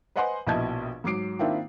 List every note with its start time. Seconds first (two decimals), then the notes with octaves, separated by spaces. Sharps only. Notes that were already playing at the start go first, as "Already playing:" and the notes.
0.16 B4 C5 D#5 F#5 G#5 C6
0.47 A#1 B2 E4 D#5 A5 G#6
1.04 G#2 F#3 D6 C7 D7
1.39 D#3 A#3 C4 D4 E4 F4